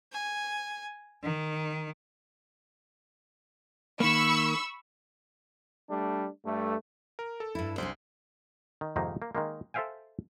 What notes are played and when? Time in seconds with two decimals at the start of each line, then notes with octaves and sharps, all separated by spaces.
0.12 G#5
1.23 D#3
4.00 D#3 A#3 B5 C#6 E6
5.90 G3 A3 D4
6.45 G2 A3
7.19 A#4
7.40 A4
7.55 G2 E4
7.78 C2 C#4 D4 C5
8.81 D#3
8.96 F2 G#2 C3 D#3 A#3 D#4
9.22 A#3
9.35 D#3 G#3 A#3
9.74 A4 C5 E5 F5 G5 G#5